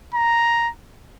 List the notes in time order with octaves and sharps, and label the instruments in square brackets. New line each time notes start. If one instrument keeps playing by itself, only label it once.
[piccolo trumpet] A#5